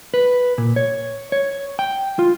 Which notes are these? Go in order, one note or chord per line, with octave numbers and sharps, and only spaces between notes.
B4
A#2
C#5
C#5
G5
F4